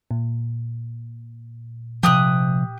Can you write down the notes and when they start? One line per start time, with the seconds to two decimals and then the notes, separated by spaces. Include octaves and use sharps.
0.11 A#2
2.03 C3 F3 G4 D#6 F#6